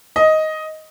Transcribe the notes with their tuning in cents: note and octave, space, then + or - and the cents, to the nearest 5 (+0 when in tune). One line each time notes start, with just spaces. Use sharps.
D#5 +10